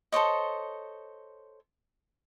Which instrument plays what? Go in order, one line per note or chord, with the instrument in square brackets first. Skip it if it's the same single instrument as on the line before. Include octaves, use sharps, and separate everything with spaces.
[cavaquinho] A4 C5 C#5 D#5